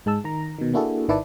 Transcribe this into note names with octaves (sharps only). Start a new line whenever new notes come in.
G#2 G#3 A5 E6
D#3 A#5
B2 D#3
A#3 D4 E4 F#4 G#4 A4
G#1 D#3 E4 B4 D5 A5